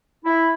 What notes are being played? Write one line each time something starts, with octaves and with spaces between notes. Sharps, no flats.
E4